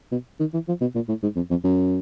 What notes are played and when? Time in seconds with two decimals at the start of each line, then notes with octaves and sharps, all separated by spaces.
0.12 B2
0.40 D#3
0.54 E3
0.68 F3
0.81 B2
0.95 A#2
1.09 A2
1.23 G#2
1.36 F2
1.50 F2
1.64 F#2